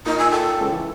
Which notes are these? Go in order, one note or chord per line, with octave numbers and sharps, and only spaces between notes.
A#2 D#4
G#5 E6
A4 G5
C#2
E3